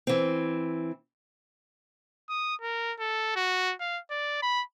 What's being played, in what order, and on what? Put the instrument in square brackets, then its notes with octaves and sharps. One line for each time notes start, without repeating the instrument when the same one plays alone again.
[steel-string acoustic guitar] E3 C4
[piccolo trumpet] D#6
A#4
A4
F#4
F5
D5
B5